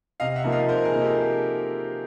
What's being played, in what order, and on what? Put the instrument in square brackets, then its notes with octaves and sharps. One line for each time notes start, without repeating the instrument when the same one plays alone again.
[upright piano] C3 [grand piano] D#5 F5
[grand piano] E5 F#5
[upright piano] F3 A#3 D#4
[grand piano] D#5 F5
[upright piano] C3 [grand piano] A#4 C5
[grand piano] G#4 A#4
[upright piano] F3 A#3 D#4
[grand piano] G4 A4